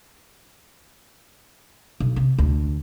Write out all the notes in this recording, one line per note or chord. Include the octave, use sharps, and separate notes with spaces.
B1
C3
D2